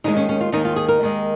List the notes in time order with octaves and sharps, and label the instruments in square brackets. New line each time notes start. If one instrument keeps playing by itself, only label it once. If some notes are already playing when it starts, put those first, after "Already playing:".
[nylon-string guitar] D#2 D#3 G#3 D#4
C#4
C#4
F4
D#2 D#3 G#3 D#4
F4
G#4
A#4
D#2 D#3 G#3